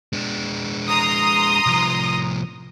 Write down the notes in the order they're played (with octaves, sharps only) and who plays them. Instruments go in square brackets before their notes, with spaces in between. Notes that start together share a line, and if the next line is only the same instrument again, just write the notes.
[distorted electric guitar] G#3 D4
[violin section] A#5 C6 D#6
[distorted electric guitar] C2 F3